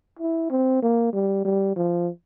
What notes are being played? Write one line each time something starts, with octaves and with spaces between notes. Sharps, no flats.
E4
C4
A#3
G3
G3
F3